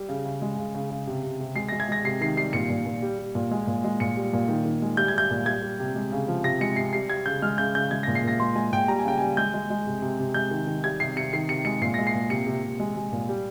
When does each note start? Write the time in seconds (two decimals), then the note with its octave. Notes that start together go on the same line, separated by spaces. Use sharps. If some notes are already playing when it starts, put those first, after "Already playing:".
Already playing: G3
0.09 C#3
0.26 C#3
0.42 G#3
0.58 C#3
0.75 C#3
0.90 C#3
1.07 C3
1.24 C3
1.40 C3
1.56 G#3 C7
1.69 G#3 A#6
1.80 G#6
1.89 G#3 A#6
2.05 C3 C7
2.21 D#3 C7
2.37 G3 C7
2.53 A#2 C#7
2.70 A#2
2.86 A#2
3.02 G3
3.19 G3
3.35 A#2
3.51 G#3
3.67 A#2
3.84 G#3
4.00 A#2 C#7
4.17 G3
4.33 A#2
4.49 D#3
4.65 D#3
4.82 G#3
4.97 G3 G6
5.08 G#6
5.14 G3 G6
5.30 A#2
5.46 G3 G#6
5.62 G3
5.80 C3
5.95 G#3
6.12 C#3
6.28 F3
6.44 C3 A#6
6.61 G#3 C#7
6.76 C3 C7
6.93 G3 C7
7.09 G3 G#6
7.26 C#3 G6
7.42 G#3 F6
7.58 C#3 G6
7.75 C#3 G6
7.91 G#3 G#6
8.03 A#2 A#6
8.15 C7
8.24 A#2 A#6
8.40 G#3 C6
8.55 G#3 G#5
8.72 A#2 G5
8.88 G3 A#5
8.99 G#5
9.05 C#3 G5
9.18 G3 G#5
9.37 G#3 G6
9.54 G#3
9.70 G#3
9.86 C3
10.02 C3
10.19 C3
10.34 G#3 G6
10.51 D#3
10.67 D#3
10.84 G3 G#6
11.00 C3 C7
11.16 C3 C#7
11.33 D#3 C7
11.48 C3 C#7
11.65 G#3 C#7
11.81 A#2 C7
11.94 G#3 A#6
12.07 C7
12.14 A#2
12.30 C3 C#7
12.46 C3
12.63 C3
12.79 G#3
12.96 G#3
13.12 A#2
13.29 G3